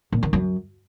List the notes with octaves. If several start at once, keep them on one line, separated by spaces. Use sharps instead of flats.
A#2
D#3
F#2